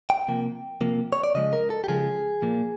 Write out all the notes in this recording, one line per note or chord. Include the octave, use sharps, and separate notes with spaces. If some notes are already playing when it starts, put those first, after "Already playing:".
G5
C3 F3 A#3
C3 F3 A#3
C#5
D5
C#3 F3 G#3 D#5
A#4
A4
G4
C#3 F3 G#3 G#4
A#2 F3 A#3